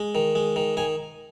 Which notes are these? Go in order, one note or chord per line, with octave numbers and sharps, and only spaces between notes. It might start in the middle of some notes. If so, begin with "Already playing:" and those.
Already playing: G#3
D#3
G#3
D#3
D#3 G#5